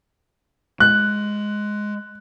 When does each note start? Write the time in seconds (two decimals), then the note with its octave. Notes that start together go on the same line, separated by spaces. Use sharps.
0.80 G#3 F#6